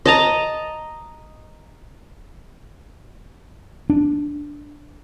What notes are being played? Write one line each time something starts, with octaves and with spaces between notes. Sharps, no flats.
D#5 A5 A#5
D4